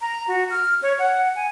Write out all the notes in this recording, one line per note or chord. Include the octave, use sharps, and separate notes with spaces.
A#5
F#4
F6
C#5
F#5
G#5